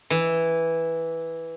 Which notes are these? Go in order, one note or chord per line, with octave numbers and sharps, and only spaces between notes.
E3